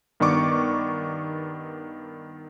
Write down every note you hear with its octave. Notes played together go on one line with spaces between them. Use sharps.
G2 D#3 B3 D5 C#6 D6